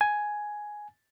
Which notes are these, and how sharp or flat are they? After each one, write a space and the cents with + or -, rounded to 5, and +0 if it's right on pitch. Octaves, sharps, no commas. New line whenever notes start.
G#5 +5